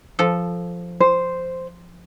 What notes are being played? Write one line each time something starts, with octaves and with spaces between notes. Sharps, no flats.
F3 A4
C5